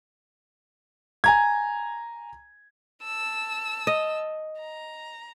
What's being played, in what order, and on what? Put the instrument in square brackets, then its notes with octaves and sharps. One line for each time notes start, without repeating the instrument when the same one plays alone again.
[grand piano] G#5 A#5 G#6
[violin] A5 E6
[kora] D#5
[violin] A#5